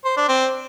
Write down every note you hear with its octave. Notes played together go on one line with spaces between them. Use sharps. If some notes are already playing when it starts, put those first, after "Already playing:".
C5
D4
C4